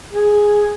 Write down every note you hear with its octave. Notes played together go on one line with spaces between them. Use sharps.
G#4